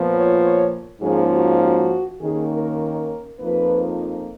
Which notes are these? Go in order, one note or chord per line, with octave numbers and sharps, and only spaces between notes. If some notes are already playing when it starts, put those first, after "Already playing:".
Already playing: A#2 F3 B3
C#5
C#5
G#2 F3 A#3 C#4 G#4
F#4
F#4
D#2 D#3 A#3 C#4 G#4
A#4
A#4
F2 F3 A#3 D#4 B4